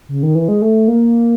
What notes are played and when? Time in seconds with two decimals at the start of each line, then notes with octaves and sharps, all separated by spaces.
0.09 C#3
0.23 D#3
0.35 E3
0.48 G#3
0.62 A3
0.88 A#3